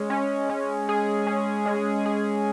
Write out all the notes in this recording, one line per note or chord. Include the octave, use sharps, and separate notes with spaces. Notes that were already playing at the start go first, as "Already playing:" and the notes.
Already playing: G#3 C#4
C#4
C#4
G#4
C#4
G#3
G#4